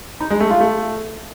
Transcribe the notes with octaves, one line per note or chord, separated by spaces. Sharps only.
D#4
G#3
A3
F4
A3